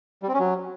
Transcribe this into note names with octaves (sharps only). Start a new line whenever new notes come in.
G3
C4
C#4
F#3